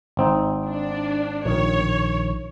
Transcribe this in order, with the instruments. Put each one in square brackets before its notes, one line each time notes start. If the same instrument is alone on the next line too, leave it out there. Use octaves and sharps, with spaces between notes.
[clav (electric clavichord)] G#1 C4 D#4
[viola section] D4
[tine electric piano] A#1 D#3 [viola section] C#5